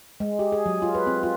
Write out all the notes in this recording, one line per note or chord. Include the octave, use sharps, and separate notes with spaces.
G#3
G4
G#4
F#3
F4
B4
C4
F4